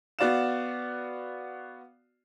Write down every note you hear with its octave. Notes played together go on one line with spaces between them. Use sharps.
B3 F#4 D5 F5 E7